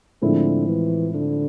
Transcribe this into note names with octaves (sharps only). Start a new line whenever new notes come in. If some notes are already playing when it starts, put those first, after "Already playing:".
A2 D3 F3 G#3 C4 E4
E3
D3